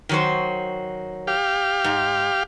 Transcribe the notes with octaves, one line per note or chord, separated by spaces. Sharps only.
D#3 F#3 C5
G4 F5
G#2